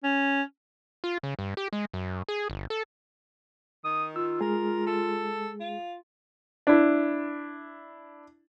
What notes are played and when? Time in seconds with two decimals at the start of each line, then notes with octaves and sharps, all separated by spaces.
0.03 C#4
1.04 F4
1.23 C#3
1.39 G2
1.57 G4
1.73 G#3
1.93 F#2
2.29 G#4
2.50 G1
2.70 A4
3.85 D#3 D#6
4.16 F4 E6
4.41 G#3 G#4 A#4
4.87 A4
5.60 F4
6.67 D4 E4